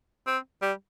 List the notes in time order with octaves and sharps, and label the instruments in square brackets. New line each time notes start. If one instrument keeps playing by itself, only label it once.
[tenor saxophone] C4
G3